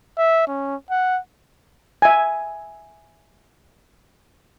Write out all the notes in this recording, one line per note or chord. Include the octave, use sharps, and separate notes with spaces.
E5
C#4
F#5
E5 G#5